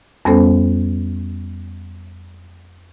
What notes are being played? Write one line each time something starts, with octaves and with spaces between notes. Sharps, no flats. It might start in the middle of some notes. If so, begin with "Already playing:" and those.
F2 G3 B3 C#4 A4 C5